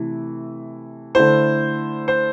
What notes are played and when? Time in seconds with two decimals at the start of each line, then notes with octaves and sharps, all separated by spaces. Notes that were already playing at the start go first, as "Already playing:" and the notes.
Already playing: C3 E3 A3 E4
1.15 D3 A3 E4 C5
2.08 C5